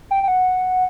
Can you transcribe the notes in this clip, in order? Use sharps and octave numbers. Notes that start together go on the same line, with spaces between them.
G5
G5
F#5